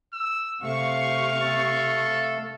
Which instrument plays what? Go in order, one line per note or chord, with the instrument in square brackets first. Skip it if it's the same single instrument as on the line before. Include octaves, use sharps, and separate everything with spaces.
[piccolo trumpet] E6
[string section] C3 C#6 [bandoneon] A3 [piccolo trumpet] F5
[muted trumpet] A4